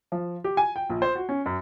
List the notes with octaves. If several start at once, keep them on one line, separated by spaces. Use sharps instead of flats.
F3
G4
G#5
G5
A#1
C5
F#4
C#4
F#2